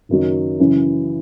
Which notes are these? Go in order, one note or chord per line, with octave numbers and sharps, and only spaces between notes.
F#1 F#2 D#3 F#3
F#2 C#3 E3